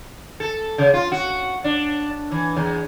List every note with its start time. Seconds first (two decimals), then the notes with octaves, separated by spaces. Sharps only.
0.40 A4
0.78 C#3
0.94 F4
1.12 F#4
1.64 D4
2.32 E3
2.56 E2